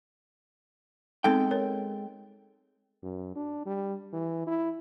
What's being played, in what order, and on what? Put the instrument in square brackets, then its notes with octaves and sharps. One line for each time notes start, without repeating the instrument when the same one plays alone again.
[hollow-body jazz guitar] G#3 A4 G5 [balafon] B3 C4 D#4
[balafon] A#4 C#5
[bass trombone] F#2
D4
G3
E3
E4